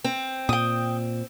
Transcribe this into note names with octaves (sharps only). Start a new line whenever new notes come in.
C4
A#2 G5 D#6